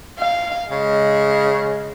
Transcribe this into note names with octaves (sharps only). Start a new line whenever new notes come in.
F5
C#3 G#3